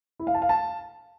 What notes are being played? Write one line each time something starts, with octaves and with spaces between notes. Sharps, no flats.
E4
F5
A5
F5
A5